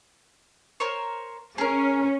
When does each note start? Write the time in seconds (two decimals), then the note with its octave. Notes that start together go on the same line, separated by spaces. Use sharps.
0.80 A#4 C5 C#5
1.58 C#4 G#4 A#4